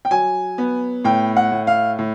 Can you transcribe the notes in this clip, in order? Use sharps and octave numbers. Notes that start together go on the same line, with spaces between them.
G5
F#3 G#5
B3
A2 G5
F#5
A2
F5
A2